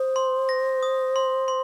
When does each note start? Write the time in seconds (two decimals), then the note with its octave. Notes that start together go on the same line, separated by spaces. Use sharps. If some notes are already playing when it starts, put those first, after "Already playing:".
Already playing: C5 D#6
0.16 C6
0.49 A#6
0.83 D#6
1.16 C6
1.48 C6